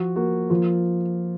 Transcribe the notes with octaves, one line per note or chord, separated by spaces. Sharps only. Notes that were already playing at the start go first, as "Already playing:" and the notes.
Already playing: F3 F#4
A#3 F#4
F3 F4